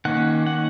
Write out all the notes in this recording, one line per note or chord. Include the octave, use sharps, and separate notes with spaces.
D#3 A#3 C#4 F#5
F#5